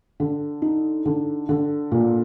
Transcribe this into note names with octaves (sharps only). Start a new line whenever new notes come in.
D3
D#4
D3
D3
A#2